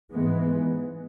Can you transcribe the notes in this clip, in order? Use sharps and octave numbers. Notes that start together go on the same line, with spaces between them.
G#2 E3 G#3 B3